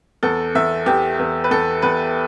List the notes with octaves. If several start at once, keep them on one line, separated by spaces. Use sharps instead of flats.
E2 A4
E2 E5
E2 G4
E2
B4
E2 A4
E2 B4